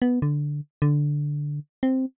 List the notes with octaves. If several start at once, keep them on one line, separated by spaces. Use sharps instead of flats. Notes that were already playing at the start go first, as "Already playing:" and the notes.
B3
D3
D3
C4